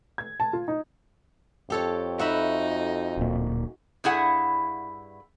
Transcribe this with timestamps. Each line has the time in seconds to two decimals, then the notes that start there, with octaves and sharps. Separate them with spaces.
0.18 G#6
0.40 A5
0.53 F4
0.68 D#4
1.70 F2 G4 A4 C#5
2.19 D#4 F#4 E5 B5
3.17 D1 A#2
4.04 G2 E4 G#4 F#5